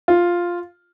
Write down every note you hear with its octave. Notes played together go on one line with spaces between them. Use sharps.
F4